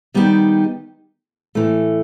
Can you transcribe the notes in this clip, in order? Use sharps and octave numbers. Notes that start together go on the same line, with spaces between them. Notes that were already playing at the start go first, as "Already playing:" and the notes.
D#3 G3 B3 D#4 G4
A2 E3 A3